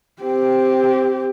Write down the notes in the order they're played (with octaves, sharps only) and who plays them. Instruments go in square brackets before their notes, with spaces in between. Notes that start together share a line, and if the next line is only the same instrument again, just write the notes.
[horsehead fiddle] C4 G4